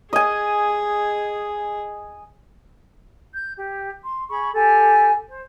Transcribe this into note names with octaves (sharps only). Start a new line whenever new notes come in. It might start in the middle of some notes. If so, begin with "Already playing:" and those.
G#4 D#5 G#5
G6
G4
C6
G#4 B5 C#6
G4 A4 G#5
C5